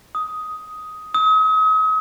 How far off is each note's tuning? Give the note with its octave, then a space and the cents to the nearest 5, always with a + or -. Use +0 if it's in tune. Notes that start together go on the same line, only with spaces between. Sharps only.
D#6 +10
D#6 +40